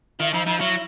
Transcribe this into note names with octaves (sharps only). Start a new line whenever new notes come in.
D#3 E4
F3 D#4
F3 D#4
F#3 E4